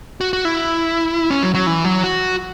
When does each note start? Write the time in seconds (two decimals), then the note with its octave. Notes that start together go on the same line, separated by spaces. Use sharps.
0.21 F#4
0.33 F#4
0.45 E4
1.30 C#4
1.43 F#3
1.54 F#3
1.67 E3
1.84 F#3
2.04 F#4